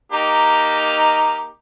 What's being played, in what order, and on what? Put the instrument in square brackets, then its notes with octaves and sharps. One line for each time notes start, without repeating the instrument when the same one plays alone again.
[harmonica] A#3 D#4 G4